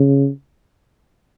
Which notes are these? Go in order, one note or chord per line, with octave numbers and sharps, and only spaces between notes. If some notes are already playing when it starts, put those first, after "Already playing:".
Already playing: C#3